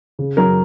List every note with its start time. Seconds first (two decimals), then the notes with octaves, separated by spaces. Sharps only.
0.19 C#3
0.37 F#3 A#4